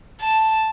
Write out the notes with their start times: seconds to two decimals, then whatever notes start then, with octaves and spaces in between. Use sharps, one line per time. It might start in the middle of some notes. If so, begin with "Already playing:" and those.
0.20 A5